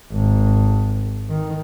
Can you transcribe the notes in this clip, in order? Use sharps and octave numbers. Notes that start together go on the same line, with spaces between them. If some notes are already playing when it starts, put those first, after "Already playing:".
G#1
D#3